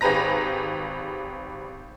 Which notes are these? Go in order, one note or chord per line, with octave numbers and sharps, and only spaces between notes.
G#1 G4 G#4 B4 A#5 A#6